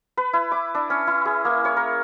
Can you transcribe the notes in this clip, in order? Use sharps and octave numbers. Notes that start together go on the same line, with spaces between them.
B4
E4
D6
D4
C#4
E4
G#4
A#3
C#5
A#4